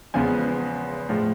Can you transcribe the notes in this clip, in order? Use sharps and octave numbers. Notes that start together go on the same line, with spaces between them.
E2 C#3 F3 G#3 B3 G#5
A2 F3 G#3